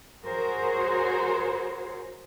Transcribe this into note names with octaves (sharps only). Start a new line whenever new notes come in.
F#4 G#4 A#4 C5 C#5